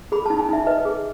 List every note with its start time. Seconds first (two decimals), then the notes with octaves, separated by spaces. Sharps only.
0.12 G#4 B5
0.26 D#4 A5
0.39 G#5
0.49 D#4 E5
0.67 B4 D#5
0.85 G#4